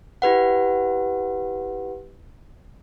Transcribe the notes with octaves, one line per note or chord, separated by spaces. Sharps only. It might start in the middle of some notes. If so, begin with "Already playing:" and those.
E4 G4 B4 F#5